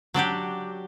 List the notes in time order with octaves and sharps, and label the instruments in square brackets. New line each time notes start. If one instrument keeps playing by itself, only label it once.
[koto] F#3 D4 F#4 G4